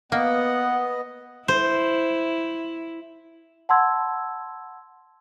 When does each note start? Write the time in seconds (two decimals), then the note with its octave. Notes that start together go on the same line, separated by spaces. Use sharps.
0.12 A#3 B3 D#5 F#5
1.48 E4 C5
3.69 F#5 A5 B5 C6 E6 G#6